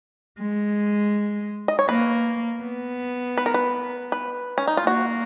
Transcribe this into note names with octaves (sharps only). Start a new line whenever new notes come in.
G#3
D#5
C#5
A#3 B4
B3
B4
A#4
B4
B4
C#4
D#4
F4
A#3 F#4